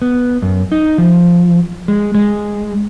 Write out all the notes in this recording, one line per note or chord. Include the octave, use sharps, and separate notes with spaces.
B3
F#2
D#4
F3
G#3
G#3